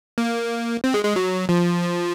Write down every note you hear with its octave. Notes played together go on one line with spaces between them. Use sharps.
A#3
C4
G#3
G#3
F#3
F3